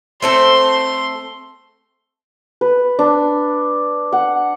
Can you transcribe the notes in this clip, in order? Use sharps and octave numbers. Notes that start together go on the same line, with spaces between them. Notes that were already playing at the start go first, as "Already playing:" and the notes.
A3 C4 A4 C6
B4
D4
F#5